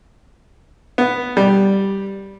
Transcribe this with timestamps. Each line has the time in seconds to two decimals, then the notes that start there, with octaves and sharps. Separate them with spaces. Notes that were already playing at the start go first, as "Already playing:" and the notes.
0.98 B3
1.37 G3